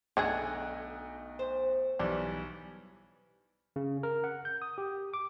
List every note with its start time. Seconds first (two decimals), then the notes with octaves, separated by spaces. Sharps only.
0.17 B1 D3 A3 D4 G#4 D#5 F#5 G5
1.39 C5
1.99 B1 E3 G3 D4
3.76 C#3
4.03 A#4
4.24 F#5
4.45 G6
4.62 D#6
4.78 G4
5.14 D6